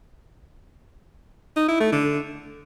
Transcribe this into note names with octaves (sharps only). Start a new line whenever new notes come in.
D#4
E4
A3
D3